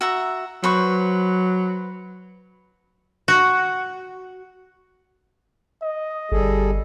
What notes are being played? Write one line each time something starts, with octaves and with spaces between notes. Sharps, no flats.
F#4 E5 A#5
F#3 B4 C5 C#6
F#4
D#5
G1 G3 G#4 A4